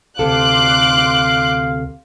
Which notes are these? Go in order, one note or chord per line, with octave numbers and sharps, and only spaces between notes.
D2 C3 A4 F5 C6 D6 F#6